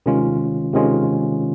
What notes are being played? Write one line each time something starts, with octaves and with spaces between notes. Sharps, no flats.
C3 D#3 G#3 C#4 F4
C3 D#3 G#3 C#4 F4